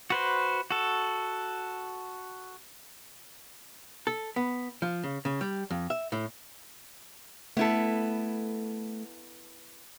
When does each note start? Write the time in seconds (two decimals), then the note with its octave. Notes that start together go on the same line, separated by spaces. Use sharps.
0.10 F#4 B4 C5
0.71 F#4 A4
4.07 A4
4.36 B3
4.82 F3
5.04 C#3
5.25 C#3
5.41 G3
5.71 F2
5.90 E5
6.12 A2
7.57 A3 B3 E4 A4